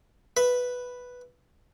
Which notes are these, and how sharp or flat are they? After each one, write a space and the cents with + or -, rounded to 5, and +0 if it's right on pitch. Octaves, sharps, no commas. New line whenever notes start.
B4 +0 E5 +0